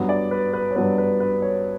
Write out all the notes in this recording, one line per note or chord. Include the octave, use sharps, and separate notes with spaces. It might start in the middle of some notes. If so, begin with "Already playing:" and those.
Already playing: G2 F#3 B3
D5
B4
B4
C#5
G2 F#3 B3 B4
B4
B4
C#5